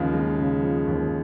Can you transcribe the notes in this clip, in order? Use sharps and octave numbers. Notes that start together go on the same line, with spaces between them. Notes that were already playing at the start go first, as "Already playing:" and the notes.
Already playing: D#2 C#3 F3 G#3
G#3
C#3
F3
D#2